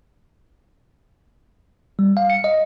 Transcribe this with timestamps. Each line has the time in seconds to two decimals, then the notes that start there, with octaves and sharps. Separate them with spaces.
1.99 G3
2.17 F5
2.30 C#7
2.44 D#5